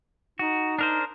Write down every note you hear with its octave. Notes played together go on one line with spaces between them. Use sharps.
D#4 F#4
D4 A#4 C5